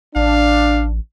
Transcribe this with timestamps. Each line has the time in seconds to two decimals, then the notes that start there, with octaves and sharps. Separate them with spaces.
0.16 A1 D4 F5